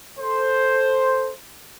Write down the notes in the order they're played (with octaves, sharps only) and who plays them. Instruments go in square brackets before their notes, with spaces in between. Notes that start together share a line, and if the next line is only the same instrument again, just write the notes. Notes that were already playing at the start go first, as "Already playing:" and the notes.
[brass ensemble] A4 C5